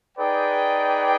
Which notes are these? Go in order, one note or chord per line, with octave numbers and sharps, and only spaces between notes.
D#4 G#4 B4 D5 G5